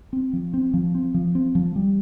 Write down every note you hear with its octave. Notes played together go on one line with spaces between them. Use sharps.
C4
F3
C4
F3
C4
F3
C4
F3
G3